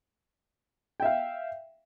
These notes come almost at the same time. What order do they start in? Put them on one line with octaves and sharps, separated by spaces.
G5 E5 F5